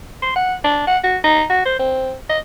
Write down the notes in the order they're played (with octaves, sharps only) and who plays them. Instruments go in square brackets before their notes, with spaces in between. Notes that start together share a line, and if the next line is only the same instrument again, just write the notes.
[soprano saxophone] C6
F#5
D4
F#5
F#4
D#4
F#4
C5
C4
D#5